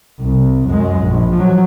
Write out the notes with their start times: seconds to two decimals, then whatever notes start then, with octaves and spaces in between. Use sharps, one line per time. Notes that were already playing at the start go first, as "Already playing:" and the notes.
0.20 C2
0.68 F#2 G#3
1.03 A#1
1.35 F3 F#3